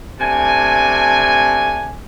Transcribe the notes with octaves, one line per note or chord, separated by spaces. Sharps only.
C3 A3 D4 G#5